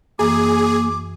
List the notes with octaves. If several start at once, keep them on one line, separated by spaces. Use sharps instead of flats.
F#2 E3 A#3 G#4 D6